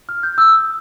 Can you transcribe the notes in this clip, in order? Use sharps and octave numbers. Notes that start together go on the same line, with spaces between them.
F6
G6
E6
D#6